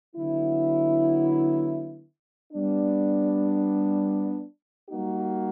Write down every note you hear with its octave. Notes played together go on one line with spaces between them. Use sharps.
D3 F#3 B3 E4
G3 B3 D4
G3 A#3 D#4 F#4